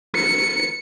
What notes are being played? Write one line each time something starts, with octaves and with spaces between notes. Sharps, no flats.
C#7